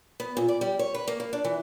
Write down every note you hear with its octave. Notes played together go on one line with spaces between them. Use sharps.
B3
A#2
D5
G3
C#5
B4
A#3
A#3
D4
E3